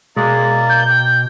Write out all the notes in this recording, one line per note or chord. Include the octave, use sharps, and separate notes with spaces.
B2 G#3 A#3 D5
G6
G5